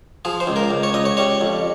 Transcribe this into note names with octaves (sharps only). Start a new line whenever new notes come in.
F3 G#4
C5
C#2
A#4
C#2
C#5
C#2 D#5
C#5
G3 C#5
F2